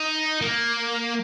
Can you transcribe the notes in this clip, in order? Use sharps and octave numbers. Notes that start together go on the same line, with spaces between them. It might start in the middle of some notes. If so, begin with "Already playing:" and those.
Already playing: D#4
A#3